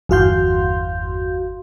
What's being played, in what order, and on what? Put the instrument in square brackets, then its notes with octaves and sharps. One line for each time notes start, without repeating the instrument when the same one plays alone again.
[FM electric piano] G1 E2 F#4 F5 C6 G6